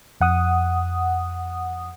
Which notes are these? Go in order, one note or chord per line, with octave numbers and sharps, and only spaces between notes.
F2 F#5 D#6